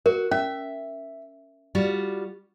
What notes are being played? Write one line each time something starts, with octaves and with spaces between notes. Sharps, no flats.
F#4 A#4
C#4 E5
G3 F4 F#4